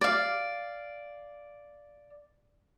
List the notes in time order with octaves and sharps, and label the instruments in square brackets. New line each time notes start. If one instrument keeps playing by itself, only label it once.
[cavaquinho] D5 F5